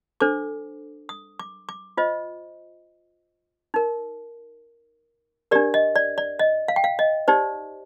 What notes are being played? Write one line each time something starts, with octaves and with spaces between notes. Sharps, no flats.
D4 A4 C5 D6
D#6
D6
D6
F4 C5 D#5
D#4 A#4
D4 G4 A#4 D5
D#5
D5
D5
D#5
F5
G5
F5
D#5
D#4 G4 C5 D5